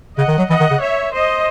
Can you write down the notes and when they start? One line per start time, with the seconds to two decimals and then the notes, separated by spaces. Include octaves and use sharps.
0.18 C#3 D#5 F#5
0.28 D#3
0.38 F#3
0.49 E3 D#5 F#5
0.60 D#3
0.71 C#3
0.80 C#5 E5
1.12 C5 D#5